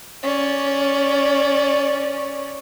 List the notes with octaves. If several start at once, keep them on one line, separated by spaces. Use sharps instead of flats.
C#4 D5